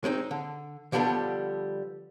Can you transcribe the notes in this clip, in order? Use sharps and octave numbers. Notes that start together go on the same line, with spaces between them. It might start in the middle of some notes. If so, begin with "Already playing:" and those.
G#3 C4 C#4 D#4
D3
D3 F3 G3 B3 D4 A4